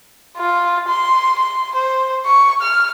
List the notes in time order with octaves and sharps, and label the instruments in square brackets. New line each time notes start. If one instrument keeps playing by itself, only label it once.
[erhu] F4
C6
C6
C5
C#6
F6